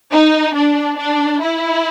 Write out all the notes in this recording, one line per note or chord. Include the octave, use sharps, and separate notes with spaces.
D#4
D4
D4
E4